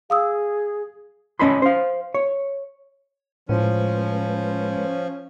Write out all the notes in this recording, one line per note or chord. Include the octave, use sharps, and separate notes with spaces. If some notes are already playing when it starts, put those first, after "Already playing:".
G#4 F5 D#6 E6
C#4 D#5 A5 B5 C6
C5 F5
C#5
A2 F3 G#3 C#4 B4